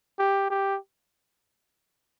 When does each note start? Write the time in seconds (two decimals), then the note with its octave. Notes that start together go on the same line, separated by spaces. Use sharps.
0.19 G4
0.50 G4